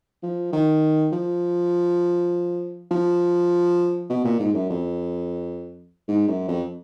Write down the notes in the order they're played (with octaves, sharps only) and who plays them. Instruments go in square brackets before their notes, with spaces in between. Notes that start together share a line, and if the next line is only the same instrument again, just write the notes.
[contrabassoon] F3
D#3
F3
F3
B2
A#2
G#2
F#2
F2
G#2
F#2
F2